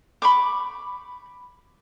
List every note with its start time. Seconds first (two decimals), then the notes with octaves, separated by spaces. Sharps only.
0.22 B5 C#6 D6